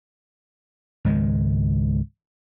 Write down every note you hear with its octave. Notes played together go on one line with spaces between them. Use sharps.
C#2 G#2 D#3 G#3